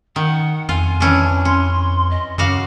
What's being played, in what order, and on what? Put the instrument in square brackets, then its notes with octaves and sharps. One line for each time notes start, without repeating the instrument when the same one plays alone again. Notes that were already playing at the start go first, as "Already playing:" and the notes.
[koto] D#3 [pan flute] F#5
[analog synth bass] F2 [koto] F4 [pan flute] G#5
[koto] E3 C#4 D4
[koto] C#4 [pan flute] C6
[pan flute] D#5
[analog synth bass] F#2 [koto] C#3 F#4 F5 [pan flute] D6